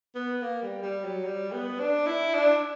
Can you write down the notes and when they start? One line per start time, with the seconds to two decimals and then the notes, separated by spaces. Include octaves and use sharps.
0.15 B3
0.42 A#3
0.62 G3
0.83 G3
1.04 F#3
1.25 G3
1.52 B3
1.80 D4
2.07 E4
2.34 D4